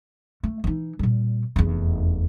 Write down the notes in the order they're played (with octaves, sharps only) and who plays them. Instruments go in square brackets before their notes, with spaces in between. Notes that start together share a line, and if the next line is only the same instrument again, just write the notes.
[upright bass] A3
E3 D#4
A#2 G3
F1 E2